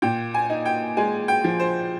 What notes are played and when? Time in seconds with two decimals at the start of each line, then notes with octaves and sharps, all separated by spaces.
0.02 A#2 G5
0.34 G#5
0.50 D#4
0.66 G5
0.97 G#3 G#5
1.28 G5
1.44 F3
1.60 C5